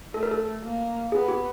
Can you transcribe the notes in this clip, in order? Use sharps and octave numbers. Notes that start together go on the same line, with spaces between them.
A3 A4
A#4
A4
A#3
B3 G#4
G4